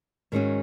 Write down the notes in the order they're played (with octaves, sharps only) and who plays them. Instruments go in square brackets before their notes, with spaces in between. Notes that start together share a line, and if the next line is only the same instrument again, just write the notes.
[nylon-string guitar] G#2 D#3 G#3 C#4 F#4